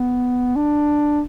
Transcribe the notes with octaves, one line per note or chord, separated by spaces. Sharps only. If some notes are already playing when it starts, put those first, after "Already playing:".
Already playing: B3
D4